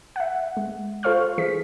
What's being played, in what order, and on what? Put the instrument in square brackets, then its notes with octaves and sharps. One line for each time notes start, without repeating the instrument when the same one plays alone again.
[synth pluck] E5 F#5
G#3
F4 A4 C5 F5 C#6 F6
E3 G#4 B6